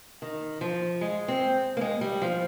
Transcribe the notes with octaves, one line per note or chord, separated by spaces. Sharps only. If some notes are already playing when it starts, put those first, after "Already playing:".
D#3
F3
G#3
C4
A#3
G#3
G3
F3